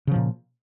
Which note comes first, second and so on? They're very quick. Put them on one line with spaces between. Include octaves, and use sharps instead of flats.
C#3 F3 A#2